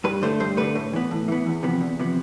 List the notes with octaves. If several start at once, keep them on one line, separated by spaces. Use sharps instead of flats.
G2 B4
D3 A3 C5
G2 C5
D3 A3 B4
A2
E3 B3
A2
E3 B3
E2
C3 F3 B3
E2
C3 F3 B3